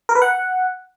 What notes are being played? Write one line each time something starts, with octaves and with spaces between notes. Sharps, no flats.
A#4
B4
F#5